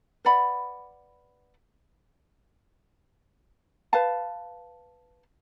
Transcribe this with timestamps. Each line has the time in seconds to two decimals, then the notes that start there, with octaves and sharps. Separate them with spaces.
0.25 B4 D5 F#5 B5
3.93 B4 F5 A5